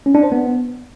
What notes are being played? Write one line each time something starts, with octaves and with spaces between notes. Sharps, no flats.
C#4
D4
C5
B3